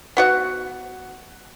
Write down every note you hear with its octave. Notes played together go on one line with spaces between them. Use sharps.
B3 F#4 F#5